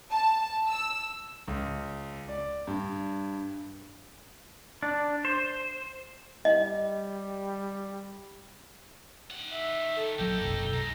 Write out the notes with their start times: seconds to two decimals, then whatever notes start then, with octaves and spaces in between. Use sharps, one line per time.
0.12 A5
0.67 E6
1.48 C#2
2.28 D5
2.67 G2
4.83 D4
5.25 C5
6.45 G3 D#5
9.31 D#3 F#5
9.52 E5
9.96 A4
10.19 A#1 F#3 A#3 D#4 G5
10.41 F#1 B1
10.73 B1 G#2 A#5